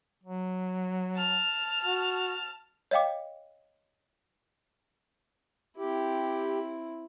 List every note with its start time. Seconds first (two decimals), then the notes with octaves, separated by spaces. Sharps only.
0.24 F#3
1.16 A5 F6
1.85 F#4
2.91 C#5 D#5 F5 G5 D6
5.78 C4 E4 G4